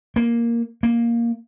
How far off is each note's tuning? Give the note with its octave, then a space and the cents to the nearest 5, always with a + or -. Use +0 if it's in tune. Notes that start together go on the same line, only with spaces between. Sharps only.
A#3 +5
A#3 +5